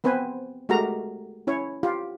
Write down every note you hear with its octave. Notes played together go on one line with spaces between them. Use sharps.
B3 C4 B4 C5 G#5
G#3 A3 F#4 G4 A#4 A#5
C#4 E4 C#5
F4 G4